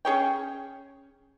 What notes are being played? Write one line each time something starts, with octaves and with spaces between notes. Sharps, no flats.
C#4 G#4 C#5 G5